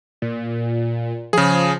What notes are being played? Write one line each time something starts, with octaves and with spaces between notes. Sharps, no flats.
A#2
C#3 F3 G#4